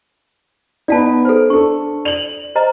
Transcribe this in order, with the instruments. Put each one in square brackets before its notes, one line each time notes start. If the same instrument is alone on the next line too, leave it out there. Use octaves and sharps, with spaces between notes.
[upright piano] B3 D#4 [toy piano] D5 F5 A5
[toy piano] A4 C5
[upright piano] D4 A4 [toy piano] C#6
[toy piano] D5 [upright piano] F7 F#7
[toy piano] C5 D#5 A#5